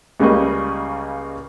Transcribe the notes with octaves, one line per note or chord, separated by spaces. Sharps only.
C#2 C#3 G3 A#3 D#5 C#6